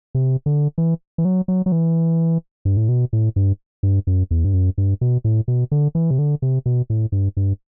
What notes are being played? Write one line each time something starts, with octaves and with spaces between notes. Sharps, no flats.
C3
D3
E3
E3
F#3
F#3
F#3
E3
G2
A2
B2
A2
G2
G2
F#2
E2
G2
F#2
G2
B2
A2
B2
D3
E3
C3
D3
C3
B2
A2
G2
G2